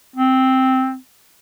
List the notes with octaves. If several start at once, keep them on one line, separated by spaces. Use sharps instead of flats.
C4